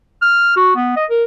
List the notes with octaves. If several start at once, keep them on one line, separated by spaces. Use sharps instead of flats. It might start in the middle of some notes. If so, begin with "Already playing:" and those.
F6
F#4
B3
D#5
A#4